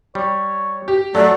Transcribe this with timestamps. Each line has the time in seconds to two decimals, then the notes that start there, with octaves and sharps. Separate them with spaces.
0.15 G3 C#5
0.88 G4
1.15 F#3 A3 A4 D5